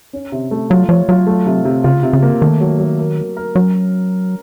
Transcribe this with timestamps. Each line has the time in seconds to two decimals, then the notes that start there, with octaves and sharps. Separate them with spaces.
0.13 C#4
0.32 C3
0.51 A3
0.70 F#3 F4
0.89 F3 C#5
1.09 F#3 F4
1.27 A3
1.46 C3
1.65 C3
1.84 C#3 F4
2.03 C3
2.13 C#3
2.22 A#3
2.41 D#3 A3
2.60 F#3
2.79 F#3
2.99 A#4
3.17 A#4
3.37 A#4
3.55 F#3 C#4